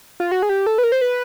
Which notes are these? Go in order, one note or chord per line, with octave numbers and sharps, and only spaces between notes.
F4
F#4
G#4
G4
A4
B4
A#4
C5
B4